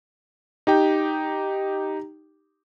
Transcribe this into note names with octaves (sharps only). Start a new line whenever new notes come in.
D#4 G4 G5